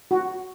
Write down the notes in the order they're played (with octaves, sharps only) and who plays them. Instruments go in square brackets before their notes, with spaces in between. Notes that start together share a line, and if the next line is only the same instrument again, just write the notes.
[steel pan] F#4